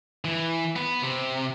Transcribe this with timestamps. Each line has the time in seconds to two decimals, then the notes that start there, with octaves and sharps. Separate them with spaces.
0.25 E3
0.76 B3 B4
1.02 C3